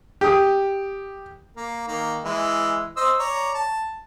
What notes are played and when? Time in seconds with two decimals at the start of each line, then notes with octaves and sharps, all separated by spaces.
0.21 G4 D#6
1.56 A#3
1.87 D#3 A#3
2.24 E3 G#3 E4
2.96 C5 D#5 E6
3.19 C#5 D5 A#5
3.54 A5